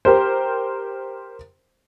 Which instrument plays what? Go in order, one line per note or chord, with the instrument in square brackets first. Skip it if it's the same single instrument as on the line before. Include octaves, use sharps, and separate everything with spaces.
[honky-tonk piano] G4 A#4 C5